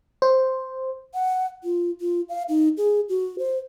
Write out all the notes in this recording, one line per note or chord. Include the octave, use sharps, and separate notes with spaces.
C5
F#5
F4
F4
F5
D#4
G#4
F#4
C5